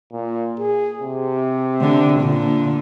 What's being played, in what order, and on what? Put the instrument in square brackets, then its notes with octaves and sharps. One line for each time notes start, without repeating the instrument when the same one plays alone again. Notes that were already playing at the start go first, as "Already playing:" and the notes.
[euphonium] A#2
G#4
C3
[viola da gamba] D3
A#2 D3